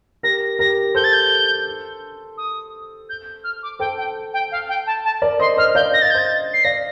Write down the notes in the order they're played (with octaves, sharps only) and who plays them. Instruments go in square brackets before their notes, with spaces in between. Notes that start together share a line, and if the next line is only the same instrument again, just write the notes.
[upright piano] G4 A#4 [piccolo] A#6
[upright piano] G4 A#4 [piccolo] A#6
[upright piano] A4 C5 [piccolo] G6
[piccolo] A6
G6
D#6
G6
F6
D6
[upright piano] A4 C5 [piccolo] G5
[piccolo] G5
G5
F5
G5
A5
A5
[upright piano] A#4 D5
[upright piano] C5 D#5 [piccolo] C6
[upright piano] C5 D#5 [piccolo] F6
[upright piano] D5 F5 [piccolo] G6
[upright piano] D#5 [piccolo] A#6
[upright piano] F5 [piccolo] A6
[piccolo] G6
[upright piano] C5 D#5 [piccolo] A6
[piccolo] C7
[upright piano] D5 F5 [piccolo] A#6